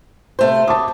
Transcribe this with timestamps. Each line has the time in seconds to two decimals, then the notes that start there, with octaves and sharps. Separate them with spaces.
0.39 C3 A3 C5
0.68 C#5 A5 D6 D#6